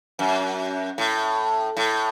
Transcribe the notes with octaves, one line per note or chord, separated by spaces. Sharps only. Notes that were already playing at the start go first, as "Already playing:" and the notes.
F#2
A2
A2